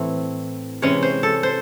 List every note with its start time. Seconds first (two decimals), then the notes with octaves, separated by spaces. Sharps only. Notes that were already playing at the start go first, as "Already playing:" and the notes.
Already playing: A2 E3 A3 C4
0.82 C3 E3 G#3 C#4 C#5
1.03 C5
1.23 A4
1.43 C5